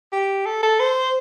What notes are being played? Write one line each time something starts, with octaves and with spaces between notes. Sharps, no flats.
G4
A4
A4
C5